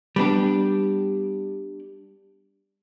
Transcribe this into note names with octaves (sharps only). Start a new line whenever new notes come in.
G3 B3 D4 G4